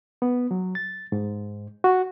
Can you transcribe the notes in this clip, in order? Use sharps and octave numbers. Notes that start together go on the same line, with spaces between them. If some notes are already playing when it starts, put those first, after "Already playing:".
B3
F#3
A6
G#2
F#4